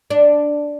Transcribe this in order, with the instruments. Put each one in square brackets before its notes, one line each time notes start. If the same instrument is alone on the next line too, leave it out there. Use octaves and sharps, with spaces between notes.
[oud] D4